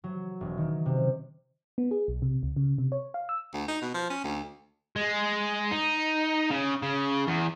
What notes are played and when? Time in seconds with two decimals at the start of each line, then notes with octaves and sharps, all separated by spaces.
0.04 F#3
0.41 E1
0.57 D#3
0.86 C3
1.78 B3
1.91 G#4
2.08 B1
2.22 C3
2.43 C#2
2.56 C#3
2.78 C3
2.92 C#5
3.14 F5
3.29 E6
3.53 D2
3.68 D#4
3.82 B2
3.94 F3
4.10 C#4
4.24 D2
4.96 G#3
5.71 D#4
6.51 C#3
6.82 C#3
7.27 E2